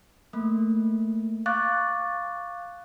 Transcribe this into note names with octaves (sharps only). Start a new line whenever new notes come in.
A3 A#3
F5 C#6 D6 F#6 A6